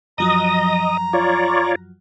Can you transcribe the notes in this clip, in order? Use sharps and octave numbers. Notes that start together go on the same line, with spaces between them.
F#2 F3 F#3 D#5 A#5 D#6
F4 C#5 D5